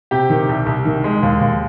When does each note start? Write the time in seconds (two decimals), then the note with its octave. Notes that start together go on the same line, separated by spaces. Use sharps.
0.11 C3 G4 G5
0.30 D#3
0.49 C2
0.66 C2
0.85 D#3
1.04 G#3
1.23 D#2
1.41 D#2